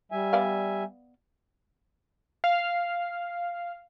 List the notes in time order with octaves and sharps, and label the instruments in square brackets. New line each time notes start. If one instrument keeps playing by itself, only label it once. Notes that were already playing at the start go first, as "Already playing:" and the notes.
[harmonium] G3 E5 G#5
[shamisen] B3 D5 F5
[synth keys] F5